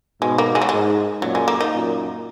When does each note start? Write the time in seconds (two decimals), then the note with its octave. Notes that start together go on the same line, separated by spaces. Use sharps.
0.21 G#2 B2 G#3
0.38 A#3
0.55 G#3
0.62 F#3
0.69 G#2 G#3
1.22 F#2 A#2 F#3
1.35 G#3
1.48 A#3
1.61 D#4
1.72 F#2 A#2